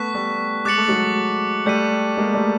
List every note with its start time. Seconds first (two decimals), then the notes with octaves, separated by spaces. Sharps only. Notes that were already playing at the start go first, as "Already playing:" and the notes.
Already playing: A3 B3 C#6 F#6 B6
0.14 G3 A3
0.65 G#3 D6 F#6 A6 C#7 F#7
0.78 A3
0.88 F#3 G#3
1.66 G3 A3 G6 B6 D#7
2.17 G#3 A#3
2.34 G3 A3